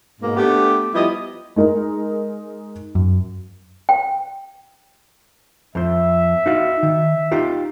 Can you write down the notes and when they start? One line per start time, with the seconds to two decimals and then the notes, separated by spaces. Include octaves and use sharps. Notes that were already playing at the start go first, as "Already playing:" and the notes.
0.21 G#2 B2 A#3
0.36 A3 B3 D4 G4
0.93 F3 G3 B3 E4 G4 D#5
1.56 G#3 D#4 A#4
2.95 F#2
3.89 G5
5.75 F2 C5 E5
6.46 D#4 F#4 F5
6.83 D#3
7.31 D#4 F4 G4